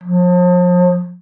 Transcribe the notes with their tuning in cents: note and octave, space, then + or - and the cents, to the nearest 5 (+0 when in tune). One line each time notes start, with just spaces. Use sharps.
F3 +40